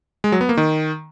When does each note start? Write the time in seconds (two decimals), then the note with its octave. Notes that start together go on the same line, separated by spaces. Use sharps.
0.24 G#3
0.32 F#3
0.41 B3
0.49 A#3
0.57 D#3